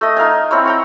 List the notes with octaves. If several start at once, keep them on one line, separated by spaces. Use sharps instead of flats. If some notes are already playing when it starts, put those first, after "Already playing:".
A3 D#5
D#4 A#4 F5 G#5
C4 E4 C#5
G5 A#5 C#6